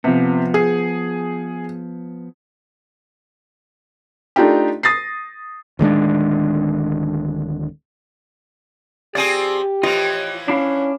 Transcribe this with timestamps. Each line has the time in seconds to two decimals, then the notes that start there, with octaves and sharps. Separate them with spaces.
0.04 C3 F3 B3
0.54 G#4
4.36 A3 D4 D#4 F4 G4
4.83 D#6 A6 A#6 C7
5.79 D1 D#3 G#3 D4
9.15 F3 C4 G4 G#4 D5 G#5
9.83 A2 E3 F3 F4 D#5
10.48 C#4 D4 E4 F5